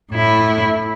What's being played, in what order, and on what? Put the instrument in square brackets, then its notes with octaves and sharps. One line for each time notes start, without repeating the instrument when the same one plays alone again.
[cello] A2 E4